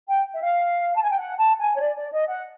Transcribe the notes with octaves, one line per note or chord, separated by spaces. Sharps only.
G5
E5
F5
A5
G#5
G5
F#5
A5
G#5
C#5
D5
D5
D#5
F#5